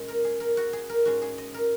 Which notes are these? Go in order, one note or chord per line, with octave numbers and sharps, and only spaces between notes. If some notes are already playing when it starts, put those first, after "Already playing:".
Already playing: A#2 G#3 C#4
A#4
G#4
A#4
F#4
G#4
A#4
G#2 G#3 C#4 F#4
G#4
D#5
A#4